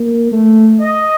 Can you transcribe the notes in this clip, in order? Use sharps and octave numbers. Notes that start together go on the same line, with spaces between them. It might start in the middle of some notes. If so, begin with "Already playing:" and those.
Already playing: A#3
A3
D#5